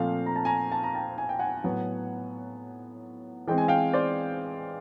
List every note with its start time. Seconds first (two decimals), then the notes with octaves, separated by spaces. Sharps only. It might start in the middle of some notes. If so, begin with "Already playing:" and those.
Already playing: A#2 F3 A3 C4 F5
0.26 A#5
0.36 A5
0.45 G#5 A#5
0.72 A5
0.83 A#5
0.95 G5 A5
1.18 G#5
1.29 G5
1.39 F#5 G#5
1.64 A2 F#3 B3
3.48 E3 G#3 C4 G5
3.58 G#5
3.68 F5 G5
3.93 C5 D5